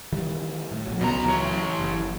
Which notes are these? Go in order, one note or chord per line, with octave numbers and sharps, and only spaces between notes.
D#3 E3 G3
A2
A#1 F#3
C#2 B2 F#3 A#5
E3 C#5
F#1